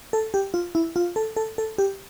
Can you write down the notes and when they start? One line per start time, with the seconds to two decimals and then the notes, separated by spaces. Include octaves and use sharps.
0.13 A4
0.34 G4
0.54 F4
0.75 E4
0.96 F4
1.16 A4
1.36 A4
1.58 A4
1.78 G4